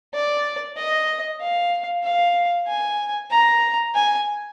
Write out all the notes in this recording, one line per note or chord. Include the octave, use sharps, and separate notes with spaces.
D5
D#5
F5
F5
G#5
A#5
G#5